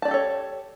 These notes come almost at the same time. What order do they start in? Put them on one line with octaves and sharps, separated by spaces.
A5 D5 G4 A4 C#5